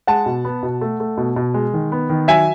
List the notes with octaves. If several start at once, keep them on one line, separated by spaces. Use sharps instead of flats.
G#3 F#5 A5
B2
B3
B2
A3
A3
B2
B2
G#3
D#3
B3
D#3
F#3 E5 G#5